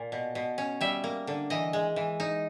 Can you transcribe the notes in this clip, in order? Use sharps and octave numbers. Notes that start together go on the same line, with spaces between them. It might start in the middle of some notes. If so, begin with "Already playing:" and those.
Already playing: A#2
B2
B2
C#4
G3 E5
A#3
D3
E3 D#5
G#3
E3
D#4